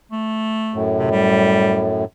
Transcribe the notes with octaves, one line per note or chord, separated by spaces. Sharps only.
A3
F#2 A2
C3
G3